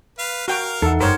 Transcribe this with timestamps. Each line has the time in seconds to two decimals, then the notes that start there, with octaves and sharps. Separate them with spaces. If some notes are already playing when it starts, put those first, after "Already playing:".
0.19 B4 F5
0.48 F#4 A#4 F5 G5
0.82 E2 D#4 A4 F#5
1.00 F#1 G2 G4 A#4 C5 C#5